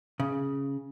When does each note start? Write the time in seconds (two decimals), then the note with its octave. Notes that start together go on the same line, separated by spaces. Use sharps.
0.20 C#3